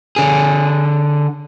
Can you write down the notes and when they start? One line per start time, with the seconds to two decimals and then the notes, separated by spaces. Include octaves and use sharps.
0.16 D3 G#4